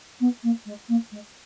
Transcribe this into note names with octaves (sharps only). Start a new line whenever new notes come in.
B3
A#3
G#3
A#3
G#3